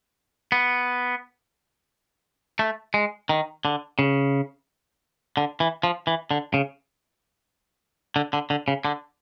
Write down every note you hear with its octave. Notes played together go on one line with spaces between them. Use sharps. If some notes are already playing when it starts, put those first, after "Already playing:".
B3
A3
G#3
D#3
D3
C#3
D3
E3
F3
E3
D3
C#3
D3
D3
D3
C#3
D3